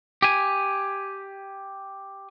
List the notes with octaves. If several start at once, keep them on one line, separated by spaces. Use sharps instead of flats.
G4 G#5